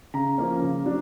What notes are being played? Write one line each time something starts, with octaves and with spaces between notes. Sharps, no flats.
C#3 A#5
F3 A#3 C#4
C#3
F#3 D4